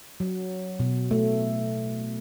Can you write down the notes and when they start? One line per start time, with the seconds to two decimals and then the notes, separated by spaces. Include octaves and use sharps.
0.20 F#3
0.79 B2
1.11 A3